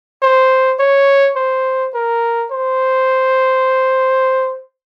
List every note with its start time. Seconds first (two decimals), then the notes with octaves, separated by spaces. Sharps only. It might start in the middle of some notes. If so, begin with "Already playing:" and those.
0.22 C5
0.79 C#5
1.36 C5
1.94 A#4
2.51 C5